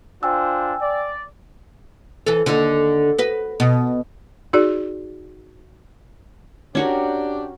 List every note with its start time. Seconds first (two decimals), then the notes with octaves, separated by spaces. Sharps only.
0.23 D4 F4 C5 G5 G#5 E6
0.81 D5
2.26 E3 A4
2.46 D#2 D3
3.19 F#4 B4
3.60 B2
4.53 D#4 F#4 G#4 D5
6.75 C#4 D4 F#4 G4 A#4